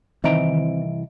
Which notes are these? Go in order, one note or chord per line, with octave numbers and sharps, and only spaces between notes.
C2 D#3 E3 C4 D#5 E5 A#5 D7